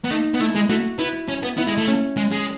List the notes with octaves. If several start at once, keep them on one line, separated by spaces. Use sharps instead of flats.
B3
A3 D#4
B3
A3 E4
G#3
A3 F#4
B3 E4
C#4
B3
B3 E4
G#3
A3
C#4
G#3
G#3